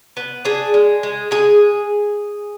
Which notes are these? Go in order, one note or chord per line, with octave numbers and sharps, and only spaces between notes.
B3
D4 G#4
G#3
G#3
G#3 G#4